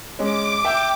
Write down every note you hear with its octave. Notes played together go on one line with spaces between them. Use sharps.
G#3 C#4 D6
E5 G5